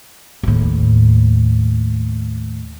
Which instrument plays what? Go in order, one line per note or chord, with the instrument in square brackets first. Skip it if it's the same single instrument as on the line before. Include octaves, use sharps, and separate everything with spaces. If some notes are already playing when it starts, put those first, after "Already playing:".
[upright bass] D#2 A2